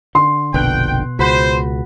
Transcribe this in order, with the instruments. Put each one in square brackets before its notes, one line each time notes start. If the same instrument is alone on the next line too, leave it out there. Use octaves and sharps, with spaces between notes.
[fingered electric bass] D3 [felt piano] C6
[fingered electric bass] F1 A#1 D3 [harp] B2 F#6 [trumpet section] G5
[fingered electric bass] C#2 [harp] F#4 B5 [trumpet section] C5